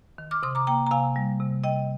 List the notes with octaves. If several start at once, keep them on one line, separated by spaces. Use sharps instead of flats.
D#3
D6 F6
C3 C6 D#6
A#5 D6
A#3 G5 A#5
A#5
C3 F5 G#5
G3
C3
C3 D#5 G5